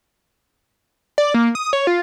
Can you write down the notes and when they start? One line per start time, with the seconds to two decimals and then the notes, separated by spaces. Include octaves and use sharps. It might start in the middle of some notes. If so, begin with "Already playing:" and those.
1.18 D5
1.34 A#3
1.55 D#6
1.73 C#5
1.87 F4